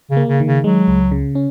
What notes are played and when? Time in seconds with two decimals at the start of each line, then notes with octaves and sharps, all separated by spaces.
0.11 C#3
0.17 A#3
0.29 C#3
0.40 D#3
0.47 C#3
0.64 F#3 G#3
0.88 C#2
1.12 C#3
1.35 C#4